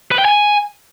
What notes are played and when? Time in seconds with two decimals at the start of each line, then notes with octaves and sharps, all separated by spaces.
0.12 B4
0.18 G5
0.25 G#5